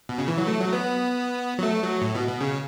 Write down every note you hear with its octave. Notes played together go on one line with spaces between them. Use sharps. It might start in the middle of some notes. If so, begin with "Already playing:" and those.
B2
C#3
E3
F#3
A3
F#3
B3
F#3
A3
F#3
A2
B2
B2
C#3